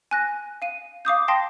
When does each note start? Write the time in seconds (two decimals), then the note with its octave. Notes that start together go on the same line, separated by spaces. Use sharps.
0.11 G#5 F#6 A#6
0.62 F5 D#7
1.05 F5 D6 D#6 G6
1.28 F5 G5 A5 C6 A#6 C7